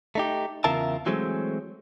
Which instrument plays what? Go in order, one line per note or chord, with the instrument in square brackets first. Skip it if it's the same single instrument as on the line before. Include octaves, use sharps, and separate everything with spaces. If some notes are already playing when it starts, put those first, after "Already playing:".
[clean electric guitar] A3 D#4 G4
E2 C#3 F4 A#4 E5 A5
E3 F#3 G#3 A3 C4